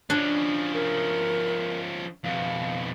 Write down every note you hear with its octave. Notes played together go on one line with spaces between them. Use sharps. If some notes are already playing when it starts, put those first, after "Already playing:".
F3 C#4 D4
A#4
F2 B2 F5